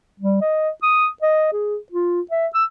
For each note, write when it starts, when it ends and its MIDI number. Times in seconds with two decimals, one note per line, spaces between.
0.20 0.41 55
0.41 0.70 75
0.83 1.08 87
1.22 1.53 75
1.53 1.77 68
1.92 2.21 65
2.31 2.47 76
2.54 2.64 88